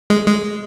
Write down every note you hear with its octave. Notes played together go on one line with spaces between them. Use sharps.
G#3
G#3